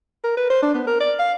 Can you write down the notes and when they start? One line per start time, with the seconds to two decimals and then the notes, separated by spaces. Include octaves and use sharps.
0.24 A#4
0.37 B4
0.50 C5
0.63 D4
0.74 B3
0.87 A#4
1.00 D5
1.19 F5